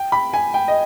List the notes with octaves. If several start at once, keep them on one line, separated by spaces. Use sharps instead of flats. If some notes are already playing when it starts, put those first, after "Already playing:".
Already playing: G5
B5
G#5
G5
D#5